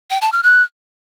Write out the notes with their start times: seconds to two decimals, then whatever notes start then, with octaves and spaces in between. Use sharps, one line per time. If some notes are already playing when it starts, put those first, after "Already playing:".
0.10 G5
0.21 A5
0.32 F6
0.43 F#6